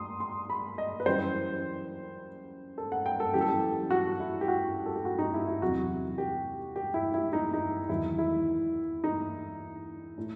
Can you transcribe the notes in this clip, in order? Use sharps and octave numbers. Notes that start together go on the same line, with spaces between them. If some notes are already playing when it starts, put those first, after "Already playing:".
Already playing: C6 D#6
C6
B5
D#5
B4
F#2 E3 G3 C5
A4
F#5
G5
A4
F#2 E3 G3 G4
A4
G4
F#4
E4
G4
F#4
A4
G4
F#4
D#4
E4
E4
E2 C3 F#3 F#4
G4
G4
E4
E4
D#4
D#4
E2 D#3 F#3 E4
E4
D#4
A2